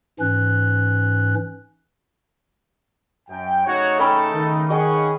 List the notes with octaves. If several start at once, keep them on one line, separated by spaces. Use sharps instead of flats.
G#2 E3 C#4 F#6
F#2 G5
C#3 A3 D#4 F#4 C#5
C#4 A4 G5 B5
D#3
C#4 G#4 D#5 F#5 G5 C#6